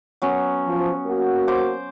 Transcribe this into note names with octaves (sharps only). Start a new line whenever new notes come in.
F#3 B3 C#4
F3
A#3 F#4
C5 D6